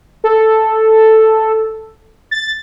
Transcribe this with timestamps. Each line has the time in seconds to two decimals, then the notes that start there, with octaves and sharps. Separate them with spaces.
0.24 A4
2.31 A6